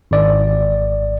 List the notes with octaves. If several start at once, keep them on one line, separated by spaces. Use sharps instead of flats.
G#1 D5